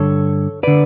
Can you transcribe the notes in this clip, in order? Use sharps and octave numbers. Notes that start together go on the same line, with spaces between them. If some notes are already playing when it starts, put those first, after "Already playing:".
Already playing: G2 D3 A4 C#5
D3 B4 D5